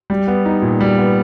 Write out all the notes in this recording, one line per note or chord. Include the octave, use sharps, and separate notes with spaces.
G3
B3
D#4
A#2
G3
B3